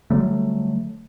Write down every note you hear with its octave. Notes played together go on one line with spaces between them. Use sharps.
D3 F#3 G3 A3